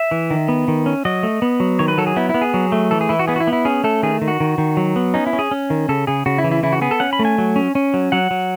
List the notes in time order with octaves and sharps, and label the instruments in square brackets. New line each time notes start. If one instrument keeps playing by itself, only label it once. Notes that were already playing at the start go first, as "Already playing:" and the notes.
Already playing: [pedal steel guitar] E5
E3
D#3
B3
D#3
C#4
F#3 D#5
A3
B3
F#3
D#3 C#5
B4
F#3 A4
G#4
B3 E4
E4
B3
G#4
F#3
A3
E3 A4
G#4
E3 E4
F#4
B3 G#4
F#4
E4
B3
E4
C#4 G#4
A3 A4
D#3 G#4
D#3
F#4
D#3
D#3
F#3
B3
C#4 D#4
E4
C#4
G#4
C#4
D#3
C#3 A4
C#3 G#4
C#3 F#4
E4
E3
E4
C#3 E4
F#4
B3 G#4
A4
C#4 F#5
B5
A3
G#5
F#3
C#4
C#4
F#3
F#3 F#5
F#3